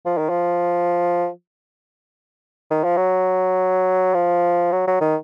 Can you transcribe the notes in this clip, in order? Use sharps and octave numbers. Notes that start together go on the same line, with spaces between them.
F3
D#3
F3
D#3
F3
F#3
F3
F#3
F#3
D#3